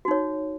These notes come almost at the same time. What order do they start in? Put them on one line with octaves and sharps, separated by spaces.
F#4 D#4 C#5